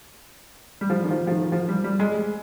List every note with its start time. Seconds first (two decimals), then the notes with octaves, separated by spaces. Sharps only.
0.81 G3
0.90 F3
1.05 D#3
1.11 F3
1.27 F3
1.31 D#3
1.52 F3
1.69 G3
1.84 G3
2.00 G#3